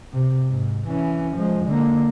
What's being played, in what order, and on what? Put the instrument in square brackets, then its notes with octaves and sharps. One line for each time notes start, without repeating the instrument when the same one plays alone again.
[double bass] C3
G#2
E3 C#4
F3 G#3
D3 A#3